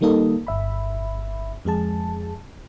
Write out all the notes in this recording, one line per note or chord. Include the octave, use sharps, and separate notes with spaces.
D#3 G3 A#3 D#4 A4 D#5
G1 E5 B5
F2 G#3 G#4 A5